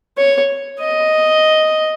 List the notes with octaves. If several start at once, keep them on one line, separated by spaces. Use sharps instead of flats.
C#5
D#5